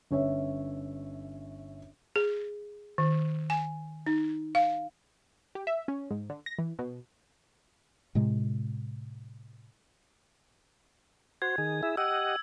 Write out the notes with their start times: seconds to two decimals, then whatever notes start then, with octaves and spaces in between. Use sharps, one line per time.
0.11 G1 C#4 C#5 E5
2.16 G#4
2.98 D#3
3.50 G#5
4.06 D#4
4.55 F5
5.55 G4
5.67 E5
5.88 C#4
6.11 G#2
6.30 D3
6.46 A#6
6.59 E3
6.79 B2
8.15 A2 C3 G#3
11.42 F#4 C5 G#6
11.58 D#3 G#4
11.83 E4 G#4 E5
11.97 G4 D#5 F#5 E6